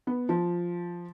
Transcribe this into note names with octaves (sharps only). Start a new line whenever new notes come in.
B3
F3